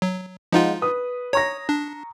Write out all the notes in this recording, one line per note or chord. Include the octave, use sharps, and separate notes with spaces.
F#3
F3 G#3 D#4 F4 F5 F#5
B4 D#6
C#5 A#5 C#6 A#6
D4